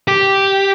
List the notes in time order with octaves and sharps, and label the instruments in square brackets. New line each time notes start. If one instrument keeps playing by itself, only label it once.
[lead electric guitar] G4